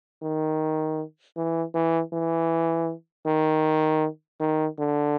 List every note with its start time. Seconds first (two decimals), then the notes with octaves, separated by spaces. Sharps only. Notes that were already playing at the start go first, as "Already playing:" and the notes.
0.22 D#3
1.37 E3
1.75 E3
2.13 E3
3.27 D#3
4.40 D#3
4.79 D3